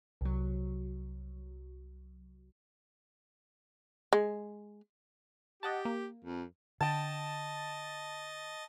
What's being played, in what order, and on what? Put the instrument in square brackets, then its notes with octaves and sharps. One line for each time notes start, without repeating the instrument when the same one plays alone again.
[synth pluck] C2 F#3
[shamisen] G#3
[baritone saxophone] G4 [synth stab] D#5 F#5 A5
[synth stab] A#3
[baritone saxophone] F2
[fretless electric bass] D3 [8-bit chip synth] D#5 A6 [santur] G5 A5